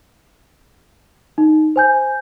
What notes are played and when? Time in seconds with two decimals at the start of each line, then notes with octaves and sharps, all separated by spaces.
1.38 D#4
1.76 C5 G#5 G6